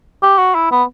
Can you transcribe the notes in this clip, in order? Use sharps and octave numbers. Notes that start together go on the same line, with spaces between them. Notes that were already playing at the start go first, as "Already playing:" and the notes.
G4
F#4
E4
B3